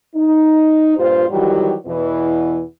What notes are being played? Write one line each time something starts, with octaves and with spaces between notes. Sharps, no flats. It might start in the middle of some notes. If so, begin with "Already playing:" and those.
D#4
G2 A#2 F4 G4 C5
D#3 E3 F#3 G3 F#4 G4
E2 B2 E3